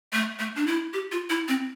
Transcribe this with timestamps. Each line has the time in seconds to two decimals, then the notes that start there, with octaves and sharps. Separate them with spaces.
0.13 A3
0.40 A3
0.56 D4
0.67 E4
0.94 G4
1.12 F4
1.30 E4
1.48 C4